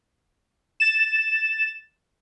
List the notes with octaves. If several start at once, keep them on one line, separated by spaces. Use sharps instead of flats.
A6 E7